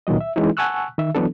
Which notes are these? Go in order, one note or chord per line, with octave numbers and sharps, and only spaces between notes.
C#2 A#2 D#3 F#3 D#5
E5
E3 G#3 C#4 D#4 E4
F#5 G#5 A5 C#6 E6 F#6
D#3 E5
E3 F#3 B3 D4 A4